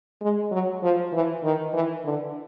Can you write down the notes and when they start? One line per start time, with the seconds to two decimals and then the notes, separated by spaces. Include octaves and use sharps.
0.22 G#3
0.52 F#3
0.83 F3
1.13 E3
1.44 D#3
1.74 E3
2.05 D3